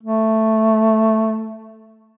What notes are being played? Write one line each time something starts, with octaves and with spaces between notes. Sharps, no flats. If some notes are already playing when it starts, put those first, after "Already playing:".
A3